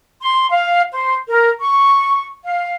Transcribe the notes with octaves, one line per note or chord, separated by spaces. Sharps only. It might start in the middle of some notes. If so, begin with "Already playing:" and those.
C6
F5
C5
A#4
C#6
F5